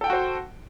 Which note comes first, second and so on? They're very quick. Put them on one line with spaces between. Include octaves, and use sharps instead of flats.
A4 G5 F#5 F#4 C5